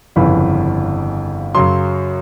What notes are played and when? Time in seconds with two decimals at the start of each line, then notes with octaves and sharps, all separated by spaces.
0.16 G1 F2 C#3 E3 B5
1.55 F#2 C#3 F#3 C6